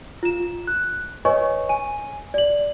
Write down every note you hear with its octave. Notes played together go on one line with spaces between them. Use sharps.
F4 E7
F#6
B4 C#5 D#5 G#5 C#6
G#5 D#7
D5 F#7